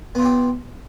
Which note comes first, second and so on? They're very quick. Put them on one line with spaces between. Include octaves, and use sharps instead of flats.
B3 F4 E4 G4